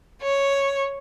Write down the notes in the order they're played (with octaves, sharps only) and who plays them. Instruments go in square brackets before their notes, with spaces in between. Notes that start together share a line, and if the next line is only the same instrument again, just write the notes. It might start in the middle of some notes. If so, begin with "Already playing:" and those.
[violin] C#5